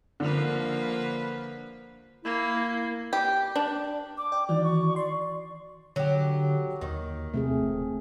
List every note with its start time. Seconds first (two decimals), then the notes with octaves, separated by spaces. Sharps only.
0.20 D3 F3 A#3 B4
2.25 A#3 E4
3.13 G4
3.56 D4
4.17 D6
4.32 D5 G5
4.49 D#3 E3 F#4 D5
4.64 C#6
4.96 D5 C6
5.96 D3 F#3 G4
6.81 D#2 D#3
7.34 C3 A3 C4 G#4
7.60 E1